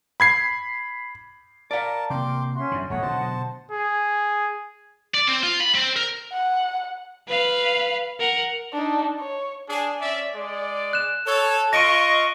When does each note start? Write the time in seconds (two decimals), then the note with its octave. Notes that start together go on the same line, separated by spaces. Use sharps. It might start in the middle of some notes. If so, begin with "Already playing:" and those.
0.20 B5 G#6 C7
1.71 A#4 D5 F5 A5
2.10 C3 A#3 A#4 G5 C6 D6
2.55 C#4 F#4 E5 C6
2.72 F#2 D3
2.90 D#1 B1 G#2 A3 C#5 D#5 F#5
3.02 B2 D3 F#3 C5 A5
3.71 G#4
5.14 D5
5.27 C4
5.43 F4
5.60 B5
5.75 C4
5.97 A#4
6.32 F#5
7.28 B4 F5
8.20 A#4 F#5
8.72 D4 D#4
9.19 C#5
9.69 D4 G#4
10.01 C#4 D5 E5
10.35 G#3 D5
10.93 F#6 E7
11.27 A4 C#5
11.73 F4 D#5 C#6 A#6 D7 D#7